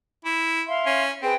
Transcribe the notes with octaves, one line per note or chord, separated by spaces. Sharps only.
E4
E5 F5 C6
C#4
C4 G#4 B4 G5